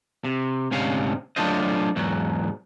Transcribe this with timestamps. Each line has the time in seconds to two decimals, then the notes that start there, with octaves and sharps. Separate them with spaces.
0.25 C3
0.71 D2 G#2 C3 C#4 F5
1.36 F#3 A3 D4 F4 C5 D#5
1.96 E2 G#2 F#3